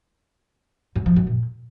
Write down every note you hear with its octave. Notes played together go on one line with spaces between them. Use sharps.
F#2
F3
F#2
A#2